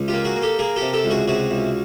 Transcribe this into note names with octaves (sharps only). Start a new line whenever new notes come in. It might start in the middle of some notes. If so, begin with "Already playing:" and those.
Already playing: C#2
F4 G4
A#3
F#4 G#4
A#3
G4 A4
A#3 G#4 A#4
G4 A4
C3
G4 A4
C#2
F#4 G#4
C3 F#4 G#4
C#2